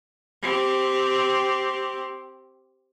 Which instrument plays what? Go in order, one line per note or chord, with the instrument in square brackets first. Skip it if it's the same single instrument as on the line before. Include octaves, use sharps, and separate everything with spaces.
[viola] C4 G4